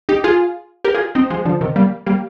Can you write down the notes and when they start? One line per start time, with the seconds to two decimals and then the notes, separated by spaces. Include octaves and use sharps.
0.09 D#4 G4
0.24 F4 G#4
0.84 G4 A#4
0.95 F4 G#4
1.15 C4 D#4
1.30 F3 G#3
1.45 D3 F3
1.61 C3 D#3
1.76 G3 A#3
2.06 G3 A#3